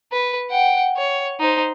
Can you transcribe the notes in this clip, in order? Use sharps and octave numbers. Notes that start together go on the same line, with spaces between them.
B4
F#5 G5
C#5
D#4 C5